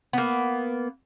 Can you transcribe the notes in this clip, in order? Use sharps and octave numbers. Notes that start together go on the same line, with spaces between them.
A#3 B3